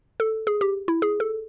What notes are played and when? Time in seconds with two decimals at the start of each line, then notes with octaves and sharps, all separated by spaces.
0.20 A4
0.47 G#4
0.61 G4
0.88 E4
1.02 G#4
1.20 A4